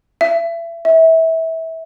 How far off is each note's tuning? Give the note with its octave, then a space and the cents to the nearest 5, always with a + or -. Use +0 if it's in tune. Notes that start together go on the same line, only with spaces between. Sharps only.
E5 +30
E5 -25